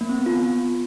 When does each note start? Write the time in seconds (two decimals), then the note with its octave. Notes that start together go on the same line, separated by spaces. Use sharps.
0.01 A#3
0.09 C4
0.18 B3
0.26 F4